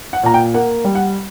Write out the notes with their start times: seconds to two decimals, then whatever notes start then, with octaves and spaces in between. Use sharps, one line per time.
0.13 F#5
0.23 A#2 A#5
0.34 G5
0.54 A#3 F#5
0.85 G3
0.95 F#5